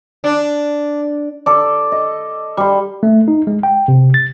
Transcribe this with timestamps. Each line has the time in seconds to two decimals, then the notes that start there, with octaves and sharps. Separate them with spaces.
0.24 D4
1.46 A4 D5
1.92 D#5
2.57 G3 C6
3.03 A3
3.28 D#4
3.47 G#3
3.63 G5
3.88 C3
4.14 A6